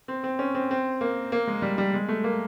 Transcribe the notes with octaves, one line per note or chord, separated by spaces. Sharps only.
C4
C4
C#4
C4
C4
A#3
A#3
G#3
G3
G3
G#3
A3
A#3